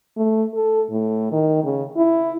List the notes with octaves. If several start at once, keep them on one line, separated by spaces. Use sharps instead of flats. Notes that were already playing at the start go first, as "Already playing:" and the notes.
A3
A4
A2
D#3
C#3
E4